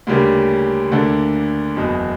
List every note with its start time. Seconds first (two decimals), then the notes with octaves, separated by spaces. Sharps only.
0.07 D2 C#3 G3 A#3 D4
0.92 D2 D3 A#3 D4
1.76 F#1 E2 B2